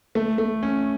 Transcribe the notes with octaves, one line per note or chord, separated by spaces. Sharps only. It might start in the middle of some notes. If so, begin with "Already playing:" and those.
A3
A3
C#4